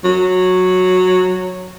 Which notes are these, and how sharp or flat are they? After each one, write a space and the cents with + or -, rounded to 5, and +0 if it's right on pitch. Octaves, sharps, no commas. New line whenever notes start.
F#3 -10